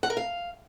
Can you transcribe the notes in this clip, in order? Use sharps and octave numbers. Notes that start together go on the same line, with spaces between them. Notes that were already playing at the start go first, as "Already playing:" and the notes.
F#5
A#4
F5